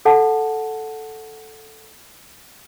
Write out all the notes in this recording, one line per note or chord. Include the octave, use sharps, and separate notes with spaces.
A4 F#5 A5